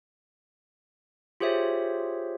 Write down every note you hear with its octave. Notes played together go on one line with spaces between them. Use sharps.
F4 G4 G#4 C5 C#5 E5